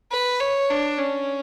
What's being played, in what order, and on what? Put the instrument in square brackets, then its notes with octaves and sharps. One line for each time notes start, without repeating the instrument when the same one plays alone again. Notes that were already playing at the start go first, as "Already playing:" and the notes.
[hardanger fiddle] B4
C#5
D4
C#4